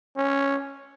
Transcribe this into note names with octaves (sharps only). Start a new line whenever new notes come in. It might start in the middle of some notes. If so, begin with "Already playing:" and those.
C#4